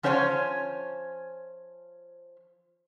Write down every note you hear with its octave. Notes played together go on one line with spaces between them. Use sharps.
F3 C#4 C5 C#5 F#5 G#5